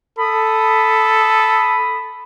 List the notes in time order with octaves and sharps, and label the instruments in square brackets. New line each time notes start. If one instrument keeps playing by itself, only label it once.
[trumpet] A4 [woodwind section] B5 D#6